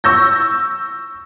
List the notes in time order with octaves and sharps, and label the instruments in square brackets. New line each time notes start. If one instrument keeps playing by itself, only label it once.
[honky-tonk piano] C#6 E6 G6 A#6